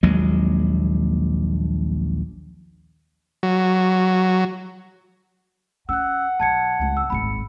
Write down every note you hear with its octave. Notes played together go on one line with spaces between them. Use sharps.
A#1 D#2 F#3 G#3
F#3
C#4 F#5 E6 F#6
B1 A5 G#6 C#7
C#2 C4
E6
D#1 G#1 B5 C#7